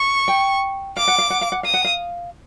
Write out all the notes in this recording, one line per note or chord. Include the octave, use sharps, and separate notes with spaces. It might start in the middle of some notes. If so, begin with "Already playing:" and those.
Already playing: C#6
G5
F5 D6
F#5
F5
F#5
F5
F#5
F5 D#6
F#5
F5